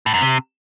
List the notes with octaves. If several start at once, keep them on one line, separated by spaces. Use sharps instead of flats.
A2
F#2
C3